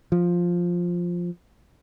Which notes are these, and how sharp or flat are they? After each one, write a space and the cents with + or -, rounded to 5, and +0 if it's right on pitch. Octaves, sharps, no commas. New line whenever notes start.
F3 +5